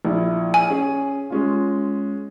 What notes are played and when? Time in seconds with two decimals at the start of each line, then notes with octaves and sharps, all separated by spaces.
0.05 A#1 E4
0.54 G#5
0.70 C#4 G#4
1.30 G#3 C#4 F4